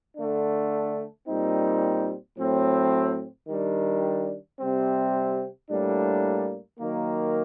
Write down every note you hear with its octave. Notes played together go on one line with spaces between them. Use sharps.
D3 A3 D4
A#2 G3 C4 D#4
A2 F#3 C4
D#3 G3 D4
C3 G3 C4
A2 G3 A#3 D4
D#3 F#3 A#3